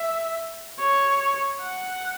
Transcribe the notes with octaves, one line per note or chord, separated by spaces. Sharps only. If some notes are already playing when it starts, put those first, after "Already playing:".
Already playing: E5
C#5
F#5